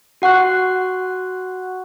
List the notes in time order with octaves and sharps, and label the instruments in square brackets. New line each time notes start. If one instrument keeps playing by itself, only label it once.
[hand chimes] F#4 F#5 C#6 F#6